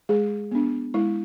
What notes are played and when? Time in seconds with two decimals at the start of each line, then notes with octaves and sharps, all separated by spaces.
0.09 G#3 G#4
0.52 B3 D4
0.94 G#3 E4